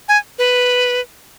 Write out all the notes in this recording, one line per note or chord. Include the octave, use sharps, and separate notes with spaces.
G#5
B4